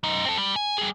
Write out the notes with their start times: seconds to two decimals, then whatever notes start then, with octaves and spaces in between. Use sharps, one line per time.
0.03 F#2 D#4
0.25 C4 A4
0.38 G3
0.56 G#5
0.78 G3 G#4